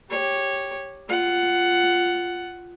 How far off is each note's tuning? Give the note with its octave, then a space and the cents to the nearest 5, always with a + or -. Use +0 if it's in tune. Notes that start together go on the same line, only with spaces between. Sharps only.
G4 +0 C#5 -10
F4 +0 F#5 +10